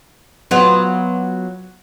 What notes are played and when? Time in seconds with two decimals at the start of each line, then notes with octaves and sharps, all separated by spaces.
0.51 F#3 B3 F4